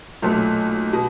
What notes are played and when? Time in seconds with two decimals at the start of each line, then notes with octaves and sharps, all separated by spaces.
0.22 B1 A#2 F#3 A3
0.93 B2